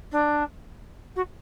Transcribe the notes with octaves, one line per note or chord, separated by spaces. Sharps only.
D4
F#4